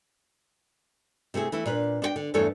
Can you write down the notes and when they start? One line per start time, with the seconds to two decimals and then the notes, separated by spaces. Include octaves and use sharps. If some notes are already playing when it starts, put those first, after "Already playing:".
1.34 C3 A3 E4 G#4
1.52 E3 A3 E4
1.66 A#2 D4 B4
2.02 D4 C5 G5
2.16 D3
2.34 E2 G2 A3 E4 A4 C#5